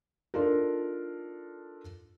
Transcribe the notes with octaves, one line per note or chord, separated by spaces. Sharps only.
D4 D#4 F4 A4 A#4